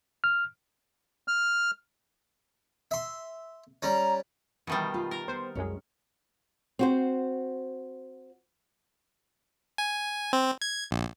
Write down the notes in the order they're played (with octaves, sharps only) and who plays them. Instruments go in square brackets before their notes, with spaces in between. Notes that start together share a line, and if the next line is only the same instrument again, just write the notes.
[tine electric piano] F6
[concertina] F6
[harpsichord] E5 C6
[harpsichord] G3 C#4 [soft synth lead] A#5
[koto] B2 D#3 G3 [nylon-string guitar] E3
[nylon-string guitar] F4 B4
[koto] A#4
[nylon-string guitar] B3 [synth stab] C5
[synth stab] C2 F#2 G#3 [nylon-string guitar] C#4
[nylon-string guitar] C4 F#4 C5
[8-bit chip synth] G#5
C4
G#6
A#1